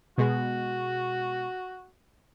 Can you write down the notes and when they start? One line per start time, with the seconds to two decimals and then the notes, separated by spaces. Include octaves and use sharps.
0.18 B2 G#3 F#4